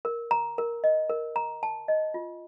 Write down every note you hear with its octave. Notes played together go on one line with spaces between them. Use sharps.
A#4
A#5
A#4
D#5
A#4
A#5
A5
D#5
F4